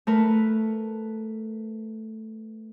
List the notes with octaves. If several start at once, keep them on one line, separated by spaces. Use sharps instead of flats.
A3 A#4 B4